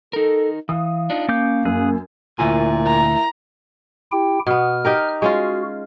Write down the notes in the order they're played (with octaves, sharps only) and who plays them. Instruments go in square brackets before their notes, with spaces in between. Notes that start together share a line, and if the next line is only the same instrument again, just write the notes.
[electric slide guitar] D#4 A#4 [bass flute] A4
[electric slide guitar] E3 [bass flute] F5 [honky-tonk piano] D#6
[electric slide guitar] D4 D#4 F4
[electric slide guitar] A#3 [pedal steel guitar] C#4 D6 G6
[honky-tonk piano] F#2 [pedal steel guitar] G#4 F#6
[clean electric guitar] D2 F4 G#5 [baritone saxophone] A#2 [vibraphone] E4 A#4 E5
[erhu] A#5
[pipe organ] E4 G4 G5
[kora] B2 B3 [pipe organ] F6
[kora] D#4 G4 A#4
[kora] G#3 C#4 F4 [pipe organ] F#4